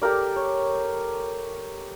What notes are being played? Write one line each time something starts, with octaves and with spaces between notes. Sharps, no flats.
G4 A4 A#4 D5
C#5